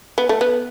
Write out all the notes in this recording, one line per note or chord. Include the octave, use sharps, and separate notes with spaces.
B3
A3
B3